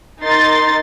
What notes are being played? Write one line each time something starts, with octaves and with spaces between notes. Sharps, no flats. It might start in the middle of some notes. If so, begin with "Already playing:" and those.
D#4 A#4 C6 A6